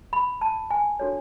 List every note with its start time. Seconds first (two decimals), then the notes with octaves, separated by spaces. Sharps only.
0.13 B5
0.41 A5
0.71 G#5
1.00 D4 F#4 A4 C#5